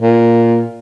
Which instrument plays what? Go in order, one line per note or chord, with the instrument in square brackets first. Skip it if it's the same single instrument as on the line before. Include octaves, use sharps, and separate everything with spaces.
[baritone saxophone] A#2